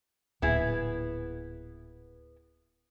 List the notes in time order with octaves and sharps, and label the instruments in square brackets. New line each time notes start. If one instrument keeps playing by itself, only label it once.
[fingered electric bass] D1 A#2 [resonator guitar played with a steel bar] B3 E4 G#4